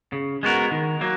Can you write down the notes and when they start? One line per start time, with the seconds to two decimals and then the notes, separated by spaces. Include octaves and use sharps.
0.12 C#3
0.43 G#3 B3 F#4 A#4
0.71 D#3
1.01 F#3 A#3